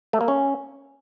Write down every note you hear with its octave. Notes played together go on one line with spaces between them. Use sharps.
A3
A#3
C#4